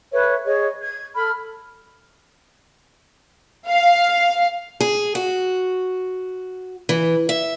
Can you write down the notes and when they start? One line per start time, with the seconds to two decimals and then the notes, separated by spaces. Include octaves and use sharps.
0.12 A4 B4 C#5 E5
0.45 G#4 C#5 D#5
0.81 G#6
1.15 A4 B5 F6
3.68 F5
4.81 G#4
5.15 F#4
6.89 E3
7.29 E5